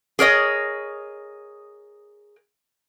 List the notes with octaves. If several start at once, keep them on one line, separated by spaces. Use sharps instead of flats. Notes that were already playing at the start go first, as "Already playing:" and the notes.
G#4 A#4 C#5 D#5